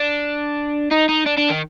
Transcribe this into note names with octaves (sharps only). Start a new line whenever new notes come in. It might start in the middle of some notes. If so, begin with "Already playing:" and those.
Already playing: D4
D#4
D#4
D4
D4
D#3